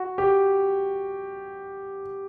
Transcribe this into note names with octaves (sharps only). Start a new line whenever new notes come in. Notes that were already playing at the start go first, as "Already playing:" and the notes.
Already playing: F#4
G4